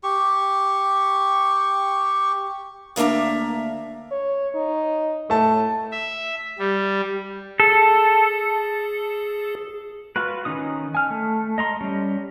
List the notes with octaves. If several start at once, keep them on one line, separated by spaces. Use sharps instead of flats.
G4 C#6
D2 A#3 D4 E5 A#5
C#5
D#4
A2 A3 A5
E5
G3
G#4 A4
F4 F#4 B4
D#3 C#4 D#4 D#6
G#5 F6
A3
D#5 A#5 C6
G3 C#4